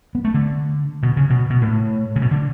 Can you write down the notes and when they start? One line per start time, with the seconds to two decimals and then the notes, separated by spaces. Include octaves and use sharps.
0.15 B3
0.25 A3
0.34 D3
1.03 B2
1.17 C#3
1.30 B2
1.50 B2
1.61 A2
2.16 C#3
2.22 B2
2.31 D3